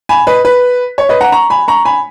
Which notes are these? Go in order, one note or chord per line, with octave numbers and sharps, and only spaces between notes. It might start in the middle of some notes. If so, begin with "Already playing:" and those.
G#5 B5
B4 D#5
B4
C#5
B4 D#5
F#5 A#5
A#5 C#6
G#5 B5
A#5 C#6
G#5 B5